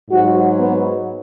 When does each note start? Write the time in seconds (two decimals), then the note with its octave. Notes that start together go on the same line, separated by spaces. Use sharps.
0.10 G#2 F#3 F#4
0.59 B3